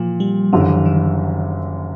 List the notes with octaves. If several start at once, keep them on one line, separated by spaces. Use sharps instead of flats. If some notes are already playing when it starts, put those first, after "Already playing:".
Already playing: A#2 E3 F3
G3
F#1 F#2 D3 E3 G3
D#3
E3
E3
D#3